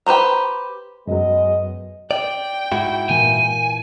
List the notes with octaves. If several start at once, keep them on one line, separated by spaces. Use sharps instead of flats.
G4 B4 C5 A#5
F#2 F#3 G#3 B3 D#5
D5 G5
G#2 E4 F#4
A#2 E3 A#3 G#5